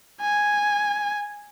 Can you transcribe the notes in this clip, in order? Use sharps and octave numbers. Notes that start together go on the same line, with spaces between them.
G#5